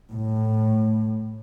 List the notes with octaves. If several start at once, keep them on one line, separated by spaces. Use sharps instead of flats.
A2